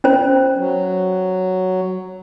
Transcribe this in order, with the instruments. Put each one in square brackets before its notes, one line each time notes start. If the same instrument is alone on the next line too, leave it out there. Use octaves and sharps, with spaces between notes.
[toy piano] C#4 C5
[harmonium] F#3